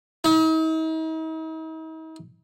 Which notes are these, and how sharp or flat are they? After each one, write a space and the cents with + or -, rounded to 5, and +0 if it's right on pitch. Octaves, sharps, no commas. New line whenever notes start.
D#4 +45